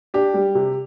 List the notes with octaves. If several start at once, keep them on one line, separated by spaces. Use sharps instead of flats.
D4 G4
G3
C3